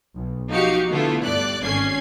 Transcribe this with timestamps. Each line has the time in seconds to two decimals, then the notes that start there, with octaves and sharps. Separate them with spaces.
0.15 B1
0.51 F3 D#4 F#4 G4 F5 C#7
0.90 D3 A3 B3 E4 F4 A4
1.23 G2 D5 F#6
1.61 G#1 C#4 G#6 C7